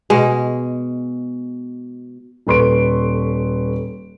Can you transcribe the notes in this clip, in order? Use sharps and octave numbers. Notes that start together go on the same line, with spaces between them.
B2 G#3
D#1 A4 B4 C6 C#6 D7